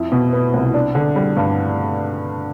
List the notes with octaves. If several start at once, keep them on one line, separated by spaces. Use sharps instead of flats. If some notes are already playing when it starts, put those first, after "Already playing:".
Already playing: F2 E4
B2
B3
C2
D4
D3
G3
G2